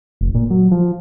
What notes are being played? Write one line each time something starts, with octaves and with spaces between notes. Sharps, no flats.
F1
A#2
F#3
F3